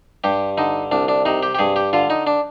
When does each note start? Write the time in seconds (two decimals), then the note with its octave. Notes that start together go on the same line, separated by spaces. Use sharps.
0.24 G2 G4
0.58 D3 D#4
0.91 C2 D4
1.08 D4
1.25 C3 D#4
1.43 G4
1.55 G4
1.59 G2 G#4
1.76 G4
1.93 D3 F4
2.10 D#4
2.27 D4